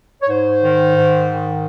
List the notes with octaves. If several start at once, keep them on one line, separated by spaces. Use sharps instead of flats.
C#5
G#2 C5
D#3
G#2
D#3